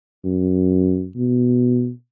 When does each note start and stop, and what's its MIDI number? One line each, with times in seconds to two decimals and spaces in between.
0.25 1.08 42
1.16 1.90 47